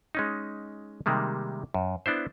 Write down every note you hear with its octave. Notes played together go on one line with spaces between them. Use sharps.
G#3 C#4 D#4
C3 D#3 G3 G#3 A#3
F#2
B3 D4 E4 C5